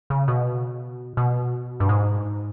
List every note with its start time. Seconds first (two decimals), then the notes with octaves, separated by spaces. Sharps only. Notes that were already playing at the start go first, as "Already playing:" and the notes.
0.10 C#3
0.28 B2
1.17 B2
1.80 G2
1.89 G#2